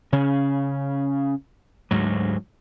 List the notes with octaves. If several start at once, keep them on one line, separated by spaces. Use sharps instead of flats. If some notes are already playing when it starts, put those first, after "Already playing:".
C#3 C#4
D2 G#2 F#3